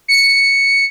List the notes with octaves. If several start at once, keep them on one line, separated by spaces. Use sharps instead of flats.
C#7